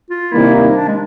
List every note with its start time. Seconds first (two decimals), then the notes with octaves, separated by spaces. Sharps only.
0.10 F4
0.32 C3 D#3 G3 A#3 E4
0.55 D#4
0.76 D4
0.88 G#3